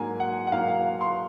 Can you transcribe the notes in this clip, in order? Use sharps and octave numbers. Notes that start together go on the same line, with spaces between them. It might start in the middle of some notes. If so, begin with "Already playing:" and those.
Already playing: G#2 F#3 A#3 G#5
F#5
F#5
G#2 F#3 A#3 F5
F5
C6